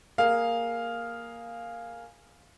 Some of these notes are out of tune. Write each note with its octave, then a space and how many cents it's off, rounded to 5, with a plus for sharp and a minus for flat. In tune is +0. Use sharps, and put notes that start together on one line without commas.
A#3 +0 G#4 +0 F5 +0